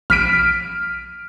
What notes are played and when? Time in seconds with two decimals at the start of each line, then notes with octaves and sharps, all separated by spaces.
0.10 A#1 F6 B6 D7 D#7